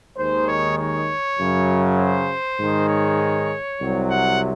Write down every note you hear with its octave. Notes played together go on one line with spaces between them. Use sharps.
D#2 D#3 G#3 C5
C#5
C#5
F#2 C#3 F#3
C5
G#2 D#3 G#3
C#5
C2 C3 F#3
F#5